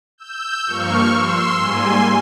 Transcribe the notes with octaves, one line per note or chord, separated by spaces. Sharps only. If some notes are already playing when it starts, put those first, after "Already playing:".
E6 G6
G2 F3 A#3 C#6 F6
C6 E6
G#2 G3 A#3 G#5 C6